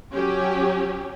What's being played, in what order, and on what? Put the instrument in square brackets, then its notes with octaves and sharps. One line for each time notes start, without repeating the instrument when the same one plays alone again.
[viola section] F#3 C#4 G4